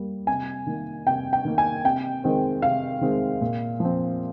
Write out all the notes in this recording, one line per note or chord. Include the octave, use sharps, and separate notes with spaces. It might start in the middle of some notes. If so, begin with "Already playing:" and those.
Already playing: G3 A#3
C3 G#5
D#3 A#3
C3 G5
G5
D#3 A#3
G#5
C3 G5
D#3 G#3 C4
C3 F5
D#3 G#3 C4
A#2
F3
C4